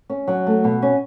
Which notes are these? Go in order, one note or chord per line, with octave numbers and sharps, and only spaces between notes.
C#4
F#3
A3
B2
C#4